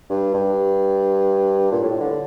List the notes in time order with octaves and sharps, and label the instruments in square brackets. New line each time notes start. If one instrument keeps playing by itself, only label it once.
[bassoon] G2
G2
A#2
A2
D3